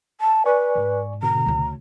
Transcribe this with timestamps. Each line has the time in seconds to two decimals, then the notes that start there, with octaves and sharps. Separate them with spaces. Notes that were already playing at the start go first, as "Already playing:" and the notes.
0.21 A5
0.46 B4 D5 G#5 C#6
0.75 G#2
1.23 B2 D3 A#5
1.46 D2 C#3